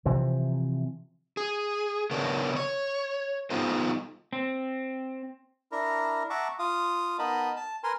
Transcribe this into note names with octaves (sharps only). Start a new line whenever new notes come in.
C3 E3 F3
G#4
C#3 F#3 B3 D4 A#4 C#5
C#5
G3 B3 D#4 F4 A4 C5
C4
D4 E4 A#4 A#5
E5 F#5 A5 A#5 C#6 D6
F4 F5 D#6
B3 D#4 A#4 D#5 A5 B5
A5
A#4 B4 G#5 A#5 C6